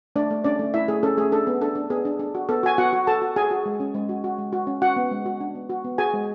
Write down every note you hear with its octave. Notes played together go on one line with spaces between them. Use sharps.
A3 D4 D5
A3
C#4 D4 D5
A3
A3 E4 E5
A3 G#4
C#4 A4
A3 G#4
D4 A4
B3
D4 A4
D4
B3 G#4
D4
D4
F#4
B3 A4
F#4 G#5
B3 F#4 F#5
F#4
F#4 A4 A5
F#4
F#4 G#4 G#5
F#4
G#3
C#4
G#3
F#4
F#4
G#3
F#4
C#4
F#4 F#5
B3
G#3
F#4
D4
B3
F#4
B3
F#4 G#4 G#5
G#3